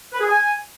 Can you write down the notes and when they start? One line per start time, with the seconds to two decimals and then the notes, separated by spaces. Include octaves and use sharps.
0.12 B4
0.20 G#4
0.28 G#5